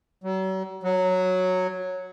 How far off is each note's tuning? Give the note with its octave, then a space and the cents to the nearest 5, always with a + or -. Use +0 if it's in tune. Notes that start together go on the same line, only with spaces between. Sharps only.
F#3 +40
F#3 -5